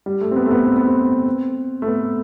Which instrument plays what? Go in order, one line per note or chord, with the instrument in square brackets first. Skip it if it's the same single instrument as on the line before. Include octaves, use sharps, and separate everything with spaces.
[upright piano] G3
A3
C4
B3
A3
B3
C4
B3
C4
A3
B3